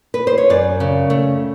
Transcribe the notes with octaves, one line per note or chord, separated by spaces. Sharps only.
B4
C5
C#5
F#2 D5
C#3
A3